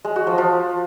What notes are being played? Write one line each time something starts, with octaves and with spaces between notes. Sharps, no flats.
G#3
F#4
F3
F3